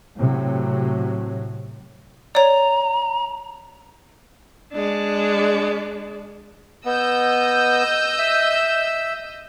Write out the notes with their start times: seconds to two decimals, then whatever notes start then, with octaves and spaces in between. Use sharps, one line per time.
0.17 A2 C3 F#3
2.35 C#5 D5 A#5
4.73 G#3 D4
6.85 B3 D#5 E6 G6
8.19 E5